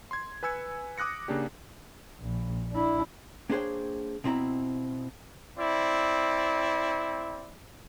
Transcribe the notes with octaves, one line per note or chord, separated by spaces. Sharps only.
C6 G#6
B4 G#5 E6 G#6 C#7
D6 D#6 F#6 A#6 C#7
C#3 A#3 D4 G4
A#1
D4 E4
A#3 D4 G#4 C5 C#5 G5
B2 C4 E4 A#5 B5
C4 E4 D5